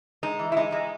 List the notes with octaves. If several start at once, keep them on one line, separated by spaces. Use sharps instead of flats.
G#3 D#4
E3
E4
G#3 D#4
G#3